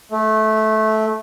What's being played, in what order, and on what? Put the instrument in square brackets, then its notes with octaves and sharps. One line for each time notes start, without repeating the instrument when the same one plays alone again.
[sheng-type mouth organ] A3